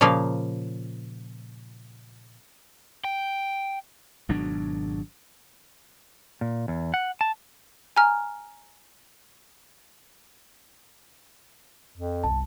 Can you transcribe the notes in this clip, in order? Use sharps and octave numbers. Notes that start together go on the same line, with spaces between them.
A#2 C#3 F3 A#3 F5
G5
G#1 B2 F#3 D4
A#2
E2
F#5
A5
G#5 A#5 F6
F2
G1 C2 A5